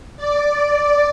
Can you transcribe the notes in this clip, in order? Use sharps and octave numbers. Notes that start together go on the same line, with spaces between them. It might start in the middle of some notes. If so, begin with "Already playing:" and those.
D5